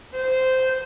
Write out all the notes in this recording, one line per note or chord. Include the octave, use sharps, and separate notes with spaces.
C5